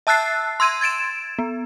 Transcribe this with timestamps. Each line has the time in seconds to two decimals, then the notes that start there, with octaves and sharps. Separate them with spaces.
0.07 E5 A5 E6 F#6 A6 C7
0.60 C6 E6 G#6 D#7
0.81 G#6 A6 D7 E7
1.39 B3